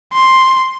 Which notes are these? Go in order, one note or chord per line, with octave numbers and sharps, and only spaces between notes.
C6